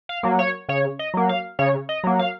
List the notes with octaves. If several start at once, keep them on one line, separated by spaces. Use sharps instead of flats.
F5
F#3 A#3
C#5
C#3 C#5
D#5
F#3 A#3
F5
C#3 C#5
D#5
F#3 A#3
F5